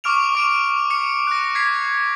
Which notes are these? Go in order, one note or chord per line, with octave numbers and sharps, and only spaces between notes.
C#6 D6 F6 D7 F7
C#6 D7
D6 F6 C#7
F#6 A#6
G#6 B6 C7